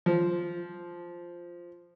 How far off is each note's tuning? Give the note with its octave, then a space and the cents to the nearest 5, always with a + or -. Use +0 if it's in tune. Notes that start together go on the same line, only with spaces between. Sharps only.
F3 -5